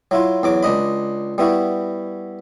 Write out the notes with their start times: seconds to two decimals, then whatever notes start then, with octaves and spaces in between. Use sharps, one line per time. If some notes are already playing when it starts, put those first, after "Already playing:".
0.11 F#3 E4 F4
0.43 E2 F#3 D6
0.63 C#2 D4 D#5 B5
1.38 G3 B3 E4 F#4